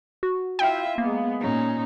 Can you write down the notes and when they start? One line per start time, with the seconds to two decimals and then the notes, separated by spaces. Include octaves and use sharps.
0.23 F#4
0.59 E4 F4 E5 F5 G5
0.98 G#3 A#3 B3
1.40 A#2 C#4 D#4